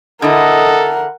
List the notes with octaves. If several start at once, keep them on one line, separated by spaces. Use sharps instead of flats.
D3 E4 A4 A#4 D#5 F#5